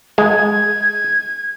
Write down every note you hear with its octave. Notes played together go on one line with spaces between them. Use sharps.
G#3 G#6